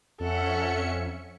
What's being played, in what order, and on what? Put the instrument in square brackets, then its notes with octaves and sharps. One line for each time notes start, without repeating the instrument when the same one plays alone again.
[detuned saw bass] F2 [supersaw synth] C#4 E5 C#7 [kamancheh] A4 F#5